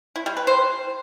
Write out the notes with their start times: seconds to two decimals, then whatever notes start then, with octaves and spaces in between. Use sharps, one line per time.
0.16 E4
0.26 G3
0.37 B4
0.47 C5